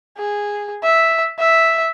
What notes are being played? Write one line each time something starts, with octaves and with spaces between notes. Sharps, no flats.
G#4
E5
E5